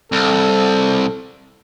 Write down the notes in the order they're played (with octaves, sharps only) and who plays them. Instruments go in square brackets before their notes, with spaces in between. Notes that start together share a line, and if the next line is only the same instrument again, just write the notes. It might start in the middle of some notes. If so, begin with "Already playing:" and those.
[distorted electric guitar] C2 [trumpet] A4